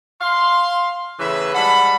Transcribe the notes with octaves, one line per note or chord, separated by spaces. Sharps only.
F5 C6
A2 C#3 E3 B3 B4 E5
G#2 G3 F#5 A5 B5